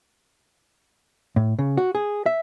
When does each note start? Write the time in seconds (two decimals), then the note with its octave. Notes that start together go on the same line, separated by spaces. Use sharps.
1.36 A2
1.59 C#3
1.77 F#4
1.95 G#4
2.26 E5